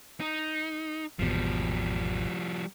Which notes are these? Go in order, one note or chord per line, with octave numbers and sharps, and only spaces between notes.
D#4
G#1 E2 B2 F3 G3